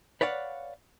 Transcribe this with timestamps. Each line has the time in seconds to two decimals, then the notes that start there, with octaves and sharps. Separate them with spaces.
0.21 B4 C#5 D5 F5 F#5